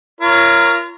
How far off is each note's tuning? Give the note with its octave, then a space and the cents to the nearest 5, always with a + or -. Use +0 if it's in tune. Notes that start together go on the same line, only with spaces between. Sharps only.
F4 -40 A#4 +0 C#5 +0